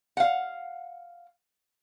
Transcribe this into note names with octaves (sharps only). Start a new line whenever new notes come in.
F5 F#5